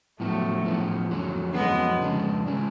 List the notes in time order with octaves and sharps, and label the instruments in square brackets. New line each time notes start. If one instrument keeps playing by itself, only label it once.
[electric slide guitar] A2 F3 B3 [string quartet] F#3 A3
[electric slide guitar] A2 F3 B3
F2 D3 F#3 C#4
[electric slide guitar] F2 D3 F#3 C#4 [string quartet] G#3 B3
[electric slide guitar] F2 C#3 G#3 D4
C#3 G#3 D4